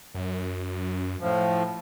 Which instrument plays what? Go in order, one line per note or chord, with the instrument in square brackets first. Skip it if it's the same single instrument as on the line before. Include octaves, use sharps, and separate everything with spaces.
[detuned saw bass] F#2
[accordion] A2 F3